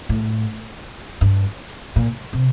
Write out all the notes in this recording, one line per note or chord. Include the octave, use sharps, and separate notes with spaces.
A2
G2
A#2
C3